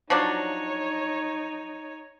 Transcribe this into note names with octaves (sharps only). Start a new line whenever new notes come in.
F3 F#3 D4 D#4 C#5